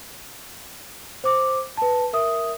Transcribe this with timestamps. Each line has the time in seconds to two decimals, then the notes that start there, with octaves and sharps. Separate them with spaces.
1.24 C5 D6
1.77 B4 A5
2.13 A#4 E5 D#6